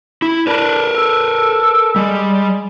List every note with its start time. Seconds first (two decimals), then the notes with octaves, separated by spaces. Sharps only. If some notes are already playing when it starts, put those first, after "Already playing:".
0.22 E4
0.47 D4 A#4 B4
0.95 A4
1.96 G3 G#3